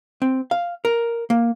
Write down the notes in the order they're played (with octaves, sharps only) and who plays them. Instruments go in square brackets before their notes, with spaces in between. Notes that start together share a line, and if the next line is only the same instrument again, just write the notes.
[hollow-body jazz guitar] C4
F5
A#4
A#3